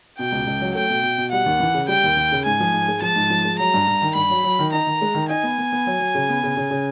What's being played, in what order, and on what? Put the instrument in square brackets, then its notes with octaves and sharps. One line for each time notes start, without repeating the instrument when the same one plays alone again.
[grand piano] B2 [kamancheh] G5
[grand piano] C#2
C#2
F#3
[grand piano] A3 [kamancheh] G5
[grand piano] B2
B2
B2
[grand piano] G3 [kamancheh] F#5
[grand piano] D#2
E3
C#3
[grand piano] G3 [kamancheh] G5
[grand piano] D#2
D#2
C#3
[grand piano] G#2 [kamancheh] G#5
[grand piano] F3
G#2
G#3
[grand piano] F3 [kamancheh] A5
[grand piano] G#2
F3
G#3
[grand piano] F#3 [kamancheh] A#5
[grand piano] G2
G2
D#3
[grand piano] G2 [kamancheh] B5
[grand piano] F#3
F#3
D#3
[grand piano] D#4 [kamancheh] A#5
[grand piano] D#3
G#3
D#3
[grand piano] D#4 [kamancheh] G#5
[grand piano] B3
B3
B3
F#3
F#3
C#3
B3
C#3
C#3
C#3